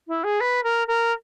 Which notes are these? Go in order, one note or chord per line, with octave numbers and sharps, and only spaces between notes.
E4
G#4
B4
A#4
A#4